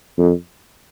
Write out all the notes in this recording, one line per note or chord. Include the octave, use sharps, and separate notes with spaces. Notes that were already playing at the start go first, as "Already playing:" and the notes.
F2